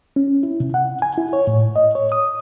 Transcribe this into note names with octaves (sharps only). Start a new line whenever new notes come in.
C#4
E4
C3
F#5
G#5
E4
C#5
A2
D#5
C#5
D#6